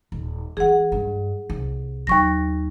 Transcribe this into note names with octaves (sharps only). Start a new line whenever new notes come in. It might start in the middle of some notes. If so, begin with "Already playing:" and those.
D#1
E3 C#4 G#4 F#5
G2
C2
D#2 F#3 A#3 C#6 A#6